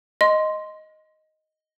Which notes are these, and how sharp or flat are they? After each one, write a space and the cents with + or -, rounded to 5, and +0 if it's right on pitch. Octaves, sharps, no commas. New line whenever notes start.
D#5 +0 C6 +0